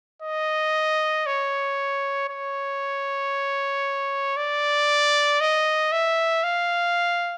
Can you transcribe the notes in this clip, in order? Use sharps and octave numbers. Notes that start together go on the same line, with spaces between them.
D#5
C#5
C#5
D5
D#5
E5
F5